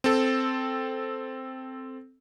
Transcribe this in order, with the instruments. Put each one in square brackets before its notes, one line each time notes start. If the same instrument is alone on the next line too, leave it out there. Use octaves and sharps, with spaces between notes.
[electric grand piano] C4 A4